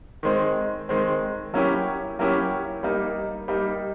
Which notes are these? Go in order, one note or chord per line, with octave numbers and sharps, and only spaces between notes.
D#3 G#3 C4
D#3 G#3 C4
F#3 A#3 C#4 E4 G4
F#3 A#3 C#4 E4 G4
G3 A#3 D#4
G3 A#3 D#4